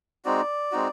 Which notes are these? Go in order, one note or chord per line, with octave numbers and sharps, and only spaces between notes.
G#3 C4 D#4 F#4 D5
G#3 C4 D#4 F#4